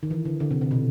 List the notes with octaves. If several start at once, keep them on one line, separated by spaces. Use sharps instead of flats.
D#3
E3
D3
D3
C3
C3
B2